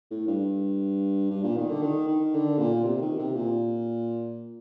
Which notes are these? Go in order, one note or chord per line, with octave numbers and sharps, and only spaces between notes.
A2
G2
G2
A#2
D#3
D3
D#3
D#3
D3
A#2
C3
D#3
C3
A#2